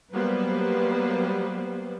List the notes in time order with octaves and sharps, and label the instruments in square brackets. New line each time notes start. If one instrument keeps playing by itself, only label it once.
[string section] F#3 G3 A#3 B3 B4 C5